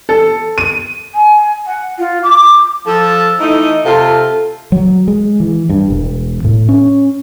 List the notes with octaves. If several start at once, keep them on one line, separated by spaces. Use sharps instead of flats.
A4
D#7
G#5
F#5
F4
D6
F3 A4
E3 A3 D#4
C3 F4 A4
F#3
G#3
E3
G2
E1
A2
C#4